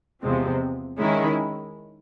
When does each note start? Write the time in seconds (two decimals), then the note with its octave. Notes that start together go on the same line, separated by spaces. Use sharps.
0.23 E2 C3 F3 G#3 C4
0.99 D#3 G#3 C#4 E4